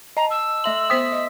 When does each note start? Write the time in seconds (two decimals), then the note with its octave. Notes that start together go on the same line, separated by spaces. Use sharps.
0.17 D#5 A5 A#5
0.30 E6
0.64 A3 E5 C6 F#7
0.90 B3 C5 G5 D#6 B6
1.12 D#5